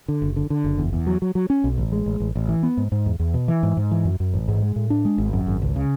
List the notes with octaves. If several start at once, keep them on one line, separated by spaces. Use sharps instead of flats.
D3
F#1
D3
D3
F#1
E2
E2
F#3
F#3
F#3
C#4
B1
A1
G#3
A1
A1
A1
E3
B3
G#2
G#2
E2
E2
B2
E3
G#2
G#2
E3
F#2
F#2
A1
G#2
G#3
A2
D4
G#3
G#1
F#2
G#1
C#2
C#3